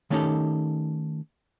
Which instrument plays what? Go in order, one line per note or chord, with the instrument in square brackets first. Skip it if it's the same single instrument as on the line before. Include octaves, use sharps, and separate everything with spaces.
[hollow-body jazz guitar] D#3 A3 C#4 D#4 G4 A4